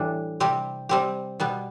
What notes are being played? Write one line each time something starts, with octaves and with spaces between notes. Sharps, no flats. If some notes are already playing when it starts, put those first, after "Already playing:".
Already playing: A2 E3 G3 D4
C3 G3 C4 G4
C3 G3 C4 G4
B2 G3 B3